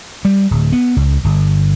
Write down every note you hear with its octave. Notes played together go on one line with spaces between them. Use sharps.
G3
D1
B3
C#2
G1